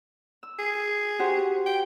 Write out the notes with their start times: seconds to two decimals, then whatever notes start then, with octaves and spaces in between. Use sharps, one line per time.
0.43 E6
0.59 G#4
1.19 F#4 G4 C5
1.66 G5